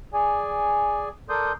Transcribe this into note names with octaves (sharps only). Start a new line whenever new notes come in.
G#4 D5 G#5
A4 A#4 D5 C6 D#6 G6